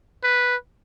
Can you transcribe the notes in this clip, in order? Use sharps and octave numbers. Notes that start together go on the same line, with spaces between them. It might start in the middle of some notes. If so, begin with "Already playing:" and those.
B4